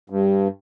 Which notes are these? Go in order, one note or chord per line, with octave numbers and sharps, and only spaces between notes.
G2